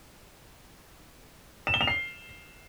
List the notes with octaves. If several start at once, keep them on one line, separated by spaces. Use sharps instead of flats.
E7
G7
F7
C7